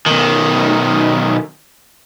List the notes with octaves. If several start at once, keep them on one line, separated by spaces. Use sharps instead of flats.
B1 D#3